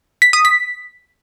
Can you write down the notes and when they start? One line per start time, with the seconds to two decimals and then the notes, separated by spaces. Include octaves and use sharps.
0.22 B6
0.33 D#6
0.45 B6